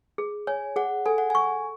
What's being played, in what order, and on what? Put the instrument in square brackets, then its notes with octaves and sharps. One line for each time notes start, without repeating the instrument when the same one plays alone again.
[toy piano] G#4
[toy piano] C#5 [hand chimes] G#5
[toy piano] G#4 [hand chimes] F#5
[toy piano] A4 [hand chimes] G#5
[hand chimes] F#5
[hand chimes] G#5 [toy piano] C#6